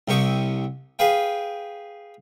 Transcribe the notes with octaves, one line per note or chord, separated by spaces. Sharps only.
C2 C3 G4 C#6 D#6
G#4 B4 F5 G5